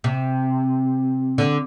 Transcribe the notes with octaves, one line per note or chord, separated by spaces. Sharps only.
C3
D3